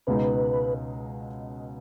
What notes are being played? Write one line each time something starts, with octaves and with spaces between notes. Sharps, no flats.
C#2 B2 G#3 D#4 B4